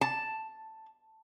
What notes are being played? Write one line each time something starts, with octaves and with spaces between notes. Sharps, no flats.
A5